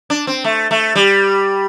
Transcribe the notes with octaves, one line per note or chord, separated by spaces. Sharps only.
D4
C4
A3
A3
G3